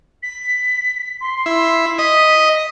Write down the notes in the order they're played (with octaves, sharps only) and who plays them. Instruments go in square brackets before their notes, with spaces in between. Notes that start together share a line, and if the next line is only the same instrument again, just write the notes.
[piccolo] B6
C6
[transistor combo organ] E4
[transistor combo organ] D#5 [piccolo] B6